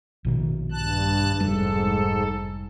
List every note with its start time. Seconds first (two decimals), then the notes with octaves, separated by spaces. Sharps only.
0.25 A#1 B2 D#3
0.71 G2 A5 F#6
1.40 F1 G#2 G3 A4